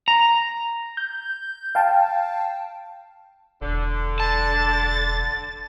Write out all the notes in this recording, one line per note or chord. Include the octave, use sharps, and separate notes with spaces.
A#5
G6
F5 G5 A5
E1 D3
A5 A6